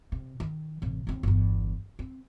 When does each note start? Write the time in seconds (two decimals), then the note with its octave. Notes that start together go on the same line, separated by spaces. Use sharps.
0.12 C3
0.40 D#3
0.82 A1 C3
1.07 D#2 C4
1.23 G1 E2
1.99 C4